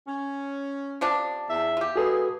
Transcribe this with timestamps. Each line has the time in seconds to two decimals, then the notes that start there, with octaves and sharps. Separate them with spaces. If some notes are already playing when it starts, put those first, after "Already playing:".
0.06 C#4
1.01 C3 F3 D4
1.49 E2 E5
1.77 F4 G4
1.96 G#3 F#4 G#4 A4 B4